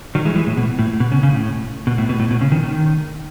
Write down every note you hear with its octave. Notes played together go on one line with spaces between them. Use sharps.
D#3 F#3
E3 G#3
E3 G#3
A2
B2
A2
B2
C#3
C#3
A2
B2
A2
B2
A2
B2
C#3
D#3
D#3